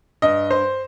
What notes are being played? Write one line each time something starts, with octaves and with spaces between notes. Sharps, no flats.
G2 D#5
C5